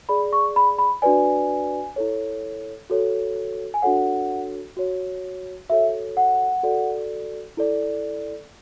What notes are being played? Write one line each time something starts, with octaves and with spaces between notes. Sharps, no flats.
G#4 D5 B5
C#6
B5
B5
D4 F#4 B4 D5 G#5
E4 A4 C#5
F#4 A4 C#5
G#5
D4 F#4 A4 C#5 F#5
F#4 C#5
F#4 A4 C#5 E5
F#5
F#4 A4 D5
E4 A4 D5